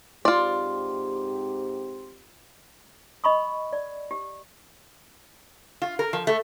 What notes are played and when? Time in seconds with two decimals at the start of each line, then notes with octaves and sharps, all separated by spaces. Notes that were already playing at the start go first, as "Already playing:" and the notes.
0.25 G#2 C4 F4 G4 D5 C6
3.24 D#5 B5 C#6 D#6
3.73 D5
4.11 G4
5.82 F4
5.99 A#4
6.13 F3
6.27 A3